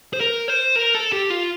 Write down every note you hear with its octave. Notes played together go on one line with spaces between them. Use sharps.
C5
A#4
C5
A#4
A4
G4
F4